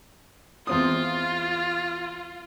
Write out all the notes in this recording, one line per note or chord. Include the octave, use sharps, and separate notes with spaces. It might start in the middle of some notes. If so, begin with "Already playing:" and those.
E2 C4 F4 D#6